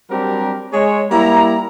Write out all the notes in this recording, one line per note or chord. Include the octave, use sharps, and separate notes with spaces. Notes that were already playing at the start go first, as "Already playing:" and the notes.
F#3 G3 C4 D4 G4 A#4
G#3 C#5
G3 A#3 E4 A#5